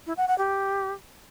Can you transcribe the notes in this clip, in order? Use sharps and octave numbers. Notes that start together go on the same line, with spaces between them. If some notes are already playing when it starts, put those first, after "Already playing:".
E4
F#5
F#5
G4